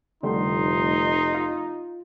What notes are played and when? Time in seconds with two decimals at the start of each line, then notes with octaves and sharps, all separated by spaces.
0.23 F1 D3 G3 A3 D#4 C6
1.35 F4